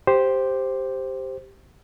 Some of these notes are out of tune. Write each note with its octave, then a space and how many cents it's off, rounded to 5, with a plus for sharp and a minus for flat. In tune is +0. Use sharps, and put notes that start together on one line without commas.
G4 +0 C5 +0